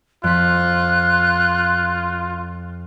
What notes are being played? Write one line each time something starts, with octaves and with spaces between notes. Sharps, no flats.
F2 F4 F#6 B6